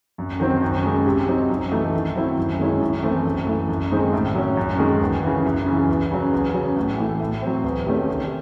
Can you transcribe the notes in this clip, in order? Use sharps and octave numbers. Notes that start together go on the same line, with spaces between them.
F#2
D#3 F#3 C4
F#2
C#3 G#3
C3
F#3 C4 D#4
F#2
E3 A3 D#4
D#3
F#3 C4 E4
F#2
D#3 G#3 C#4 E4
F#2
E3 A3 C4
F#2
E3 A3
F#2
D#3 G#3 C4 D#4
A2
F#3 C#4
F#2
D#3 G#3
E2
C#3 E3
F#2
C#3 E3
E2
C#3 F#3
E2
C#3 F#3
A2
E3 A3
A2
F#3 C4
E2
C3 D#3 A3 C#4
C3